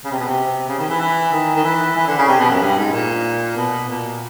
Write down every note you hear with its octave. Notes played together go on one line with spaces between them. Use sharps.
C#3
C3
B2
C3
C#3
D#3
E3
E3
D#3
D#3
E3
E3
D3
C#3
C3
B2
F#2
G2
G#2
A#2
B2
A#2